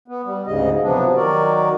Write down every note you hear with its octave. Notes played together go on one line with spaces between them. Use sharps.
B3
G3
D2 G#2 C#3 D#5
C3 F3 F#3 B3 D4
D#3 F#3 F#4 A#4 D5